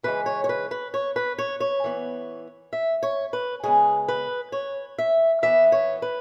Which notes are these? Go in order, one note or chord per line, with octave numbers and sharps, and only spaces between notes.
C#3 E3 G#3 B4
C#5
C#5
B4
B4
C#5
B4
C#5
C#5
E3 B3
E5
C#5
B4
C#3 G#3 B3 G#4
B4
C#5
E5
E3 B3 E5
C#5
B4